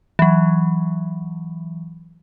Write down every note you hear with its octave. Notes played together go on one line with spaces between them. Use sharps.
E3 F#3